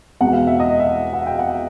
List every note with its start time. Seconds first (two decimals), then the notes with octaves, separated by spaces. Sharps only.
0.21 E2 B2 G#3 F#5
0.33 F5
0.47 E5
0.60 D#5
0.79 E5
1.13 F#5
1.26 G5
1.39 F#5